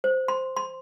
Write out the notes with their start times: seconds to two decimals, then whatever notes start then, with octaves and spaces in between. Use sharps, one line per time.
0.04 C5
0.28 C6
0.56 C6